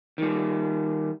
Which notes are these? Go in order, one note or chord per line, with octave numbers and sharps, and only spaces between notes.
D#3 G3